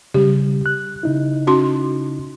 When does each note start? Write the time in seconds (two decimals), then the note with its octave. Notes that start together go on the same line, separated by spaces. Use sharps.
0.14 C#3 G3 G4
0.66 F#6
1.03 C#3 D#4 E4
1.47 C#4 F#4 C6